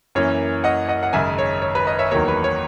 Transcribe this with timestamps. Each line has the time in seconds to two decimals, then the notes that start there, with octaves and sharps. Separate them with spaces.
0.15 F#2 E3 A#3 C#4 C#5
0.64 D#5 F#5
0.89 D#5 F#5
1.03 F#5
1.13 G#1 F#2 C#3 G#3 E5 G#5
1.38 C#5
1.62 C#5
1.75 B4
1.87 B4 D#5
1.99 C#5 E5
2.11 E2 D#3 F#3 A#3 C#5
2.28 B4
2.44 C#5